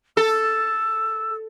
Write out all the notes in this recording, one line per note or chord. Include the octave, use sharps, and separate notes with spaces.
A4 E6